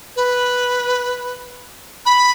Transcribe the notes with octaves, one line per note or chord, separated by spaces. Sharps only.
B4
B5